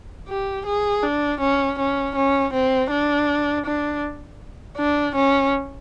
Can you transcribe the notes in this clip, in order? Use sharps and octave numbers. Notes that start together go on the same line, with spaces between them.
G4
G#4
D4
C#4
C#4
C#4
C4
D4
D4
D4
C#4